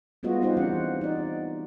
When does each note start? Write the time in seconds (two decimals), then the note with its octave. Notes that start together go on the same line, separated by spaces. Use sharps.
0.23 G3 G#3 B3 F4 F#4 D#5
0.41 B3 C4 D#4 F4 G4 C5
0.57 E3 C#4 F#5
1.01 D#4 D5